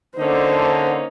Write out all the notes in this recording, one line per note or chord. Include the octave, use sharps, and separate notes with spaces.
D3 A#3 C#4 D#4 C5